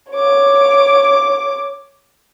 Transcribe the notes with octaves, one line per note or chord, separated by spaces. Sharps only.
C#5 D6